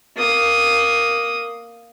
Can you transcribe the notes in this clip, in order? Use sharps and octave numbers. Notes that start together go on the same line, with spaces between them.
A#3 D#6